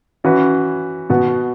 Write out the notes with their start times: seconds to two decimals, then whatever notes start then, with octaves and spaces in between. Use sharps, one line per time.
0.24 E3 C#4 F#4 B4
1.10 B2 B3 F#4 B4